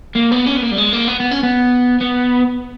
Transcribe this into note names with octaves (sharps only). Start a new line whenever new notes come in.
A#3
B3
C#4
B3
A#3
G3
G#3
A#3
B3
B3
C#4
B3
B3